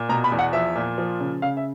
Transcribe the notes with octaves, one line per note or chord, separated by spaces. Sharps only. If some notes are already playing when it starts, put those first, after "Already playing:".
Already playing: A#2
B2 A#5
B5
E2
F#5
F3 E5
A#2
F3
C#3
C#3 F5
E5